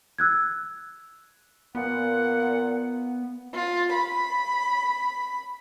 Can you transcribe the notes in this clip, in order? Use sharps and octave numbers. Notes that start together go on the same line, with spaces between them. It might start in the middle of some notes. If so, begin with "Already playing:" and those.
E6 F#6 G#6
A#2 B3 F#5
F4
B5